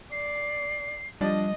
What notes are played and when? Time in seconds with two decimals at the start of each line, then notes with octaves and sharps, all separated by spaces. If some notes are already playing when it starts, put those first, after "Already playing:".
0.12 D5 C7
1.21 F3 G3 D4 D#5